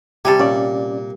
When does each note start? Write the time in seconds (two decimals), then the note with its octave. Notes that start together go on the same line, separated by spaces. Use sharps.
0.25 C3 G3 G4 A4 G#5
0.40 A#2 C#4 D5